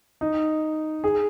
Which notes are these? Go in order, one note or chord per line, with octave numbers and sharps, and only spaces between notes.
D#4
G#4